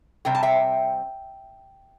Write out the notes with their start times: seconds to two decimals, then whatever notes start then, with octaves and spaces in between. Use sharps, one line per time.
0.25 C3 G3 C4 G5
0.35 A5
0.43 E5 G5